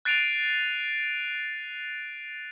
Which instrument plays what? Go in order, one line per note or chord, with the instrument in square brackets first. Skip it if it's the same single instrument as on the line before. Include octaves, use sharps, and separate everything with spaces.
[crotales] F#6 A6 C7 D7 D#7 F7